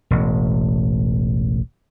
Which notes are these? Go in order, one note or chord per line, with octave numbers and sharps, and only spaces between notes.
E1 A1